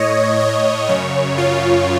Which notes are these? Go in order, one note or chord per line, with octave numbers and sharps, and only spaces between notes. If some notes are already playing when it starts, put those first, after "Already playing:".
Already playing: A2 C#5 D#5
C#5
F#2 C#3 C#5
F4